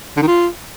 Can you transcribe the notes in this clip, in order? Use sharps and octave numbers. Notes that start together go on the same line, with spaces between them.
D3
D#3
F4